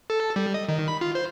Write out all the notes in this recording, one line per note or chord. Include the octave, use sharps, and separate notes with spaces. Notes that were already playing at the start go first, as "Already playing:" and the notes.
A4
G3
D#5
D#3
B5
F4
C5